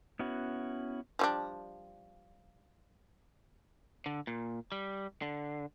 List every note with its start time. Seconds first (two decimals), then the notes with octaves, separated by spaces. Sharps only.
0.19 B3 C#4 E4 F#4
1.19 F3 G3 D4
4.06 D3
4.27 A#2
4.72 G3
5.22 D3